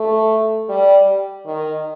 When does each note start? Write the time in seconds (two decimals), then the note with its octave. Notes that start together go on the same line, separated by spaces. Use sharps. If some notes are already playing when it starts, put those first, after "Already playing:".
Already playing: A3
0.69 G3
1.46 D#3